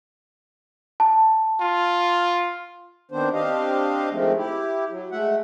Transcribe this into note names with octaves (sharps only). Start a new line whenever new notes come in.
A5
F4
D#3 B3 C4 D4 C5
C4 D4 G4 D#5 F5
D#3 F3 G#3 A3 C4
E4 G4
F#3
G#3 A3 E5 F#5